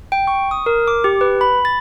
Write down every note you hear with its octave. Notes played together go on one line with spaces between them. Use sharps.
G5
C#6
D#6
A#4
D6
G4
B4
B5
A6